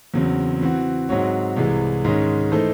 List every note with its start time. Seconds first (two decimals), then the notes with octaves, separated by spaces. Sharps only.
0.14 E2 C#3 F#3 C4
0.61 E3 C4 F#4
1.09 G#2 F#3 C4 F#4 C#5
1.57 C2 C3 E3 G#3
2.05 G#2 D#3 G#3 C#4
2.52 E3 A3 D#4 A4 C5